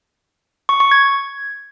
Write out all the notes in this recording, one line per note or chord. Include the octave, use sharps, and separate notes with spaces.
C#6
C#6
G#6